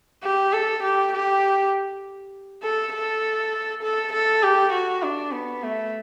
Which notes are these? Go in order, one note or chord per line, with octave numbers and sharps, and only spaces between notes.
G4
A4
G4
G4
A4
A4
A4
A4
G4
F#4
D4
B3
A3